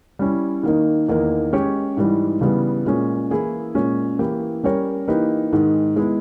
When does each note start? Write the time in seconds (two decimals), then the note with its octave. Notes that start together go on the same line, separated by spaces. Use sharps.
0.19 G3 C#4 E4
0.63 D#3 A#3 D#4
1.08 E2 D#3 A#3 D#4 A#4
1.53 G#3 C#4 G4 C#5
1.97 G#2 E3 G3
2.41 C#3 E3 G3 B3
2.86 A#2 G#3 C#4
3.31 E3 A#3 E4 G#4
3.75 A#2 G#3 C#4
4.19 E3 A#3 E4 G4
4.64 G3 C#4 G4 A#4 C#5
5.08 E3 A#3 D#4 G4 B4
5.53 G#2 D#3 G#3
5.96 G#3 B3 E4